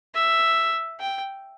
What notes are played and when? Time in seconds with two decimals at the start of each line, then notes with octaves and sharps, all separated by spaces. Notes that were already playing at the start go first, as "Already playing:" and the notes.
0.14 E5
1.00 G5